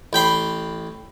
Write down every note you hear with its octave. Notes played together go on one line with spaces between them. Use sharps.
A1 G5 B5 C6